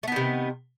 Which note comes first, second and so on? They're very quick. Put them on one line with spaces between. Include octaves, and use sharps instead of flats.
A3 B3 D#3 C3